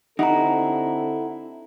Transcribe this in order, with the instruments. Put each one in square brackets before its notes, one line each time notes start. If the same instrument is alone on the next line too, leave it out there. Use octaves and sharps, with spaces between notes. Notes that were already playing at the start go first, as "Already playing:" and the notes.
[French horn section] D3 C4 A4 [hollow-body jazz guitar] D#4 E4 G4 [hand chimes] F#5 A#5